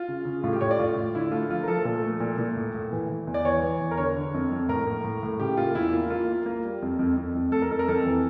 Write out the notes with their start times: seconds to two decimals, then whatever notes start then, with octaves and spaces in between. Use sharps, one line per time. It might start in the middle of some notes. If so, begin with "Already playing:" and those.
Already playing: F4
0.08 C#3
0.25 C#3
0.44 A2 F4
0.53 G4
0.61 A2 C#5
0.71 D5
0.79 A2 F4
0.96 A2
1.14 D3 E4
1.32 A3 F4
1.50 F3 F4
1.63 A#4
1.68 F3 A4
1.85 A#2 A4
2.03 A3
2.20 A#2
2.38 A#2
2.57 A2
2.74 A2
2.92 E3
3.10 E3
3.27 E2
3.34 D5
3.45 E3 C#5
3.63 E3
3.80 E2
3.91 A#4
3.97 D3 C#5
4.16 D3
4.34 F2
4.51 F2
4.69 A2 A#4
4.87 A#3
5.04 A2
5.23 A2
5.40 C#3 G4
5.57 A#3 F4
5.75 E2 E4
5.93 A#3 F4
6.10 A#3 F4
6.28 A#3
6.46 A#3
6.65 G3
6.82 F2
6.99 F2
7.17 F2
7.35 F2
7.52 A3 A4
7.62 A#4
7.71 F2 A4
7.79 A#4
7.88 F2 A4
8.06 E3